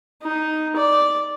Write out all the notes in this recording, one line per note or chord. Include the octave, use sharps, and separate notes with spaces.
D#4
D5